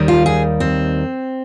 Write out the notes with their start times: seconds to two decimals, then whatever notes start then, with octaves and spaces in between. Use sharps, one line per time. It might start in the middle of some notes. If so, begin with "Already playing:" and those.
Already playing: D#2 D#3 G3
0.08 F4
0.26 G#4
0.60 C4